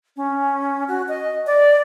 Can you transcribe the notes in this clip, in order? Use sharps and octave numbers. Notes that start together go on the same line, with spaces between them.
C#4
F#4
D#5
D5